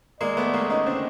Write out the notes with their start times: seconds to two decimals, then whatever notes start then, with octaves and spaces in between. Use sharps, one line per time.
0.20 G#3 A#3 D5
0.37 A3 B3
0.54 G#3 A#3
0.70 C#4 D#4 D#5
0.86 C4 D4